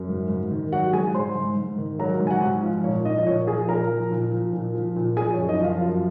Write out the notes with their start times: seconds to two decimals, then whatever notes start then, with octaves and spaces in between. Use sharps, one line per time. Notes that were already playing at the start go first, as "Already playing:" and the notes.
Already playing: F#2
0.09 G#2
0.30 G#2
0.51 D#3
0.72 F#3 F#4 F#5
0.93 G#2 G#4 G#5
1.14 G#2 C5 C6
1.35 G#2
1.57 G#2
1.78 D#3
1.99 F#3 A#4 A#5
2.20 G#2
2.27 G#5
2.30 F#4 F#5
2.42 G#2
2.63 F3 F4 F5
2.84 A#2 C#5
3.05 F3 D#4 D#5
3.18 D#5
3.26 A#2 C#5
3.47 F3 G#4 G#5
3.68 A#2 A#4 A#5
3.90 F3
4.11 A#2
4.32 F3
4.53 A#2
4.75 F3
4.96 A#2
5.17 F3 G#4 G#5
5.33 C#5
5.38 F#2
5.49 D#4 D#5
5.59 F3
5.64 F4 F5
5.81 F#2